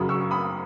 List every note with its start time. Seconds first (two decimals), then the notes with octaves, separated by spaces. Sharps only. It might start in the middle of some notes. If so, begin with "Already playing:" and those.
Already playing: F#2 C#3 F#3 B5 D#6
0.09 C#6 E6
0.31 B5 D#6